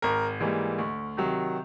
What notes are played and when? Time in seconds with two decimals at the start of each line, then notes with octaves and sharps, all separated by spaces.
0.02 G#1 A#4
0.40 G#2 E3 G3 A#3
0.78 D2
1.17 C3 D#3 F#3